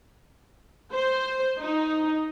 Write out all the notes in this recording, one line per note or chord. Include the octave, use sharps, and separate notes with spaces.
C5
D#4